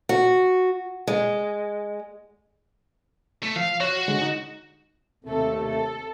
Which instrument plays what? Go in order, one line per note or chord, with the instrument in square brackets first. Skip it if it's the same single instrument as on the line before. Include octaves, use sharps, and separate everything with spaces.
[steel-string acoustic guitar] F#4
G#3
[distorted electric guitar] A3
[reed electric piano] F3 [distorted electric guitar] F5
[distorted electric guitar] F#4 [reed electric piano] C#5
[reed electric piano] D3 G#3
D#4
[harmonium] D#2 A3 [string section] C3 A4
[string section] A4